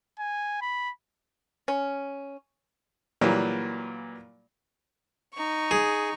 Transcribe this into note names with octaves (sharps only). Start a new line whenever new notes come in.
G#5
B5
C#4
A#2 E3 F#3 G3 A#3
D#4 C#6
G#4